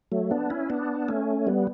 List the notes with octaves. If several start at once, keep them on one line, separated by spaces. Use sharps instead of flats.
F#3 A3
B3 D4
C#4 E4
B3 D4
A3 C#4
G3 B3